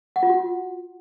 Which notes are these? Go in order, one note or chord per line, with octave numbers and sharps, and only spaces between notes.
F#5
F4
F#4